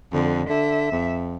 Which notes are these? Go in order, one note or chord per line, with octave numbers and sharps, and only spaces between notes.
F2 D3
D3 E5
F2